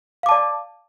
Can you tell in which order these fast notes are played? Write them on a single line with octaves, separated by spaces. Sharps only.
F5 D6 A5 D5